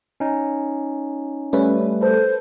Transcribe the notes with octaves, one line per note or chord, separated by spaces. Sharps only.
C#4 D#4
G3 A3 C#4 B4
A4 B4 C5